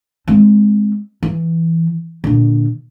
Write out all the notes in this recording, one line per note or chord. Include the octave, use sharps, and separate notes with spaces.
G#3 C4
E3
A#2 D3